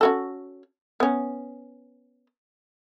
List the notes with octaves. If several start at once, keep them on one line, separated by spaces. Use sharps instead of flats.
C#4 F#4 A4
B3 C#4